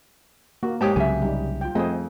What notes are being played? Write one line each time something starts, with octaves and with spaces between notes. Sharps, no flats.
A#3 F#4
G#2 G4 C#5 G5 A5 D#6
C2 C#3 F#3 E5 G#5
G3 D#4
F4 G5
F2 A3 C4 G#4 C5 D#5